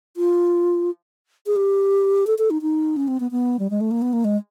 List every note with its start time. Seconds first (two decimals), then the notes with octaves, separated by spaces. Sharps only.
0.17 F4
1.46 G#4
1.56 G4
2.27 A4
2.38 A4
2.50 D#4
2.62 D#4
2.96 C#4
3.08 C4
3.20 B3
3.31 B3
3.59 G3
3.70 G#3
3.81 A3
3.91 A#3
4.02 B3
4.13 A#3
4.24 G#3